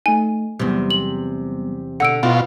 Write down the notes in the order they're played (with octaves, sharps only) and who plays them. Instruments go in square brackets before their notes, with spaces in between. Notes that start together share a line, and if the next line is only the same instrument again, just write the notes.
[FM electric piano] A3 D#4 [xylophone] G#5
[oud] E2 C3 [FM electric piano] F#3 G3 B3
[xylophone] F#7
[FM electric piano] B2 [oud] D3 [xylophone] F#5 E6 D7
[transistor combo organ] B2 F4 [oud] C4 [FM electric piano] E4